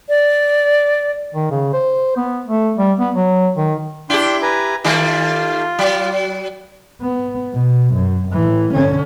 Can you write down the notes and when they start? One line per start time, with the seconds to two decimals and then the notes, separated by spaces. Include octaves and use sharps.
0.09 D5
1.34 D#3
1.51 C#3
1.73 C5
2.17 B3
2.46 A3
2.78 G3
2.99 B3
3.15 F#3
3.57 D#3
4.10 D4 E4 G4 G5 C6
4.42 B4 G#5 A#5
4.84 D#3 G3 A3 F4
5.79 F#3
7.02 B3
7.54 B2
7.94 F#2
8.33 A2 E3
8.73 D3 C#4